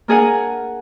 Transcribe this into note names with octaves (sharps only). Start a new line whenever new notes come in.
A#3 D4 G#4 A#4 F#5 G#5